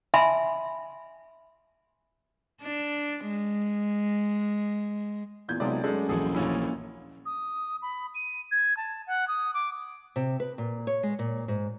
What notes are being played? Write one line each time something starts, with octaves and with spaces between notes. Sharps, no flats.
E5 G#5 A5 B5 C6
D4
G#3
E2 A#2 G6 G#6
B1 C3 G#3 F4 D5
F#2 G#3 A3 A4 D5
D#1 A#1 E3 G#4 A4
A#2 C#4 E4
D#6
B5
D#7
G#6
A5
F#5
D#6
D6
C3
B4
A#2
C#5
G#3
A#2
G#2